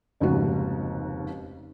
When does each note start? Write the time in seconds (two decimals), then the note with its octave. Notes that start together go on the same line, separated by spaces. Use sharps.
0.20 F1 D#2 G#2 C#3 F#4